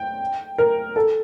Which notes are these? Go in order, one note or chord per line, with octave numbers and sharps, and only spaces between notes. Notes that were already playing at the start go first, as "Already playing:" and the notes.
Already playing: G5
A#4
A4